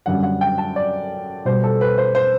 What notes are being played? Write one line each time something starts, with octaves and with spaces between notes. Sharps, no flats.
F#2 D3 G3 F#5
F#5
G5
A5
D5
B2 G3 C5
A4
B4
C5
C5